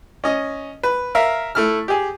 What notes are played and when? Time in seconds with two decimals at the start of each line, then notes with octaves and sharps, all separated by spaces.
0.24 C#4 D#5
0.83 B4
1.15 A#4 E5 F5
1.55 A3 E4 F6
1.88 G4 G#4